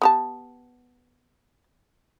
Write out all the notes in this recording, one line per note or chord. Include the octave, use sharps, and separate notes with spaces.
B3 G4 A5